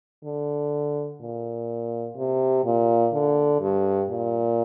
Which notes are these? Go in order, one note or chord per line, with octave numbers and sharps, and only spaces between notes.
D3
A#2
C3
A#2
D3
G2
A#2